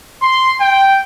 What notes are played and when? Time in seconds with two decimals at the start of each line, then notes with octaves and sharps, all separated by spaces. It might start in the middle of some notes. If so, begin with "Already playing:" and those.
0.22 C6
0.61 G5